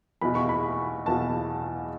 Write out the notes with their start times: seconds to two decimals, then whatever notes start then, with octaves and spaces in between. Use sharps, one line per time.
0.21 E2 B2 B5
0.35 C#6
0.49 B5
1.06 E2 B2 A5